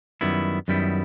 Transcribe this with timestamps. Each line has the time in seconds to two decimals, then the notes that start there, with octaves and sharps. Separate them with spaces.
0.21 F#2 D#3 G3 B3 E4
0.68 F#2 D#3 G3 B3 E4